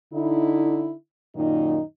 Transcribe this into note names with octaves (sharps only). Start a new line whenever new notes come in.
D3 D#4 E4
F#2 A#2 D#3 D#4